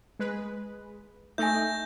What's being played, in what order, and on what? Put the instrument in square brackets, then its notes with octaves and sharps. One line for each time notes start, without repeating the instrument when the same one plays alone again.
[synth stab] G#3 B4
[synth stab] A3 D#4 [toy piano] E5 G#5 [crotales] G6 A#6